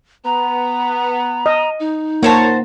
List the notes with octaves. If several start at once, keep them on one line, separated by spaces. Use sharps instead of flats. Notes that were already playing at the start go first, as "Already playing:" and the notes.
B3 A#5
D#5
D#4
A#3 F#4 C5 C#5 A5